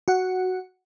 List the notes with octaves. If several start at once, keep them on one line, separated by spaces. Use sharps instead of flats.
F#4 F#5